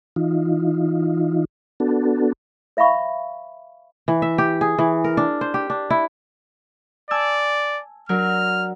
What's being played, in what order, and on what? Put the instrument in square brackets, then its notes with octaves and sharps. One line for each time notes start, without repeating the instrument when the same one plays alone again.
[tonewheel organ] E3 D#4 F4
B3 D4 F#4 A4
[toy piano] C5 E5 F5 B5 C#6
[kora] E3
E5
G4
G#4
E3
A#4
D4
C5
G4
D4
E4
[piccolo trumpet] D5 [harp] G#5 A5 E6
[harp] F#3 D4 A#4 [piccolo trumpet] F6